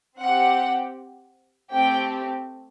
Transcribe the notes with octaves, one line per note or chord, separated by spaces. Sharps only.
C4 G4 F#5
A3 C4 G4 G5